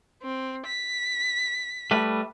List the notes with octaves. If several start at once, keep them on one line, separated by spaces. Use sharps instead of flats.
C4
B6
G3 A3 B4